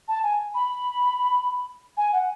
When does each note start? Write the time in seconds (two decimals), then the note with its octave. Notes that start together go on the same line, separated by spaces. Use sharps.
0.08 A5
0.23 G#5
0.54 B5
1.97 G#5
2.13 F#5